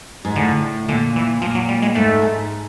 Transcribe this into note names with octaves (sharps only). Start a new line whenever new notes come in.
G#2
A2 D3
A#2 D3
E3
A#2 F3
F#3
G3
G#3
G#2 A3
G#2